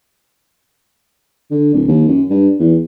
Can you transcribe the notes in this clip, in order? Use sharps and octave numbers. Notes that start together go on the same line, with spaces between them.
D3
D1
D#2
F#2
G2
E2